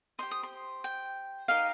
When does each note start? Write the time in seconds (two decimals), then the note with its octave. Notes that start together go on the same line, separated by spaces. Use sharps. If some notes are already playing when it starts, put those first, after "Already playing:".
0.19 G4 C5 D#5 C6
0.31 D#6
0.43 C6
0.84 G5
1.48 D#4 G4 A#4 D#5 F5